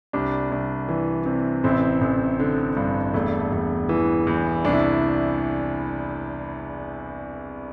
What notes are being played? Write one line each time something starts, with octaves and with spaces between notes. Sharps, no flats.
C2 D4 G4
C2
E3
C3
A1 C4 E4
A1
D3
G2
E1 A3
E1
E3
E2
C2 D4
E4